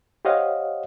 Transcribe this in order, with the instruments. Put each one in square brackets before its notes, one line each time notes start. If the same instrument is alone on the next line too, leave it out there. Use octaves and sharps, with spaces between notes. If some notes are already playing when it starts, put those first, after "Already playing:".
[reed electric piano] G4 C5 C#5 D#5 F5 F#5